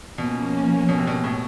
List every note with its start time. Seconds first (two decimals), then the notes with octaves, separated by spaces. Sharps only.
0.18 B2 F3 A#3 C#4
0.89 B2
0.98 C3
1.07 B2
1.24 A2